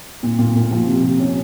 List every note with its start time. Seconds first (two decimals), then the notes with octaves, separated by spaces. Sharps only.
0.23 A#2
0.39 A#2
0.55 A#2
0.71 F3
0.87 C3
1.04 C3
1.20 C#4